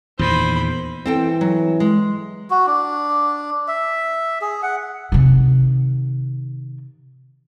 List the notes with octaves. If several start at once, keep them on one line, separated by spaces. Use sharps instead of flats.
E2 A#2 D#3 C5 B5
E3 C4 A4 G5
F#3
G#3
F#4
D4
E5
G#4
F#5
C3 D#3